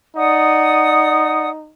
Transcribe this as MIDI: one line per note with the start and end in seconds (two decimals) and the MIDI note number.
0.16 1.72 63
0.16 1.48 74
0.16 1.48 78
0.16 1.48 87